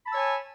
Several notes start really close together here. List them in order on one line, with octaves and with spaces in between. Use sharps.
B5 A5 E6 C#5 G#5